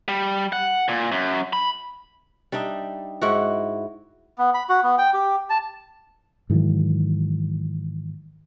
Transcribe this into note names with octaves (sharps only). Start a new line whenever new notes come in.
G3
F#5
A#2
F#2
B5
G3 D4 D#4 E5
G#2 E4 F#4
B3
B5
F#4
B3
G5
G4
A5
G#2 D#3 E3 F#3